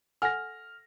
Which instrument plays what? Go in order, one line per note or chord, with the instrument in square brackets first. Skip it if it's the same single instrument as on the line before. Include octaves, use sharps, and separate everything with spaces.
[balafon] A4 F#5 G#5 [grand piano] F6 A#6